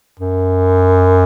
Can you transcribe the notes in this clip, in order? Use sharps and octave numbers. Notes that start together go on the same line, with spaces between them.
F#2